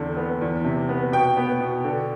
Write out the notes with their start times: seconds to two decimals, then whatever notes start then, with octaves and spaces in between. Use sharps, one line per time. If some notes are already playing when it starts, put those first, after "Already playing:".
Already playing: E2 D3 C4
0.17 B3
0.41 E2
0.64 C3
0.89 B3
1.12 B2 G5
1.37 B3
1.60 B2
1.84 D3